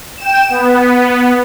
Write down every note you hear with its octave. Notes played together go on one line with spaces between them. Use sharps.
G5 E7
B3